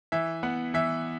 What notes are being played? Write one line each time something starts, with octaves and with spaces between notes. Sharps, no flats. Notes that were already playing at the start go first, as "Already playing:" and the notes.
E3 E5
B3 F#5
E3 E5